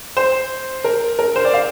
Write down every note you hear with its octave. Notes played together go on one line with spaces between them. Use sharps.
C5
A#4
A#4
C5
D5
F5